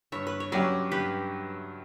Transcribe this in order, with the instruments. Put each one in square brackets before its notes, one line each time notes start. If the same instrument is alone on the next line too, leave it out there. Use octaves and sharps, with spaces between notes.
[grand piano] G2 [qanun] C#5 E5
[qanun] B4
C#5
[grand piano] F#3 C#4 G4 [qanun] B4 D5
[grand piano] G2 [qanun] G4 B4